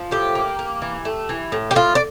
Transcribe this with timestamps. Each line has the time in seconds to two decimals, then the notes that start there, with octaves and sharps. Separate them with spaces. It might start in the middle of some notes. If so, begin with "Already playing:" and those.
Already playing: F3
0.11 A2 G4
0.35 A#3
0.59 A#3
0.82 E3
1.05 A3
1.29 E3
1.52 A2
1.71 G4
1.75 A2 F4
1.95 D5